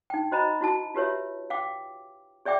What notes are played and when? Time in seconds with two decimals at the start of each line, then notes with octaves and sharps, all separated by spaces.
0.10 D#4 G5
0.32 F#4 C5 D#5 A#5 B5
0.61 E4 F#4 A5
0.95 F4 G4 B4 C#5 E5
1.50 F5 G5 D6
2.45 G#4 D5 E5 G5 D6